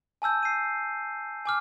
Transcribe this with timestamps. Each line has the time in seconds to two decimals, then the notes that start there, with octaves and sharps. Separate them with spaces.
0.22 G#5 A5 E6 G6
0.43 C7 D#7
1.45 G#5 D6 F6